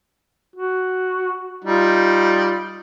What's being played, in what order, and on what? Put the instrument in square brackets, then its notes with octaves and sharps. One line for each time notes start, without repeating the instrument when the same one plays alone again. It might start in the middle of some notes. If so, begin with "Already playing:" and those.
[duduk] F#4
[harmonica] G3 D#4 [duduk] F4